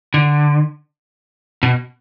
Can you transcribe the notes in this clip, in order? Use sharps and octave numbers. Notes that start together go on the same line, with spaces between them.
D3
B2